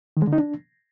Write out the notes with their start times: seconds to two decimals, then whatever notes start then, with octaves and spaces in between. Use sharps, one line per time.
0.17 D#3
0.22 G#3
0.27 D3
0.33 D#4
0.38 D4